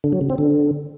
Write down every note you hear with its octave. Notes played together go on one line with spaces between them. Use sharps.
D3
F#3
C#3
C4
D3